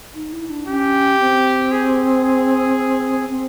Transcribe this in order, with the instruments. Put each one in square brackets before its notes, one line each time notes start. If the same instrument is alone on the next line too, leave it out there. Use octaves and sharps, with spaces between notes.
[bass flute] D#4
E4
D4
[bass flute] C#4 [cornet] G4
[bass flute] C4
[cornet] G#4
G#4
[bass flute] C4